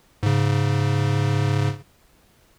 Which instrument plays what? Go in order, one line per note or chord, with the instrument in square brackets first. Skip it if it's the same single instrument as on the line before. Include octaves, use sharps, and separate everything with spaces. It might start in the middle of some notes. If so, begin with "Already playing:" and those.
[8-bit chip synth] G#2 C#3